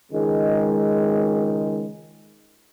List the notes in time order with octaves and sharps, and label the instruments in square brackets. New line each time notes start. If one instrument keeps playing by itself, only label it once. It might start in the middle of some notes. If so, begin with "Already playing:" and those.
[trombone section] C#2 D#3 G#3